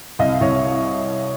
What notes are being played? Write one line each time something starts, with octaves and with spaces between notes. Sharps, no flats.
C2 D#5 F5
C2 C#5 D#5